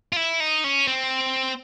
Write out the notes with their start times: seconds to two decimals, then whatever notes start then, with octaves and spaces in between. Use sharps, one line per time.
0.13 F4
0.16 E4
0.40 D#4
0.64 C#4
0.87 C4